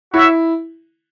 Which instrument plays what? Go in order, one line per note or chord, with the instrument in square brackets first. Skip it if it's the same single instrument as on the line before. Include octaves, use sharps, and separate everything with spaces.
[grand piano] E4 [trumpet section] F#4 C#5 E5